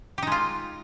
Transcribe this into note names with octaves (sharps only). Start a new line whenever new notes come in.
G#3 D#4 F4 G4